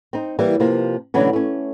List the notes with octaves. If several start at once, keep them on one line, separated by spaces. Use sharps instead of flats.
C4 D#4
E3 G3 A#3
C3 F3 A#3
B2 D3 E3 F#3 A3 C#4
A3 C#4